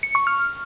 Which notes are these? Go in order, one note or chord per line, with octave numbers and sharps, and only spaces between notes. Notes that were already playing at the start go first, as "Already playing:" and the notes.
C#7
C#6
F6